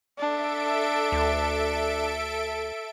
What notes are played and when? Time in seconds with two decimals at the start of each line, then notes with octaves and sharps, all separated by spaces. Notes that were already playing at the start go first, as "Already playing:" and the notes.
0.19 D4 A4 E5 D7
1.12 D2